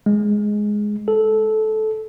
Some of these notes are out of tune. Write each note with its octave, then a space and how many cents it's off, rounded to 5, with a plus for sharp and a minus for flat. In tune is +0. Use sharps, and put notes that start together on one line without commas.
G#3 +5
A4 -15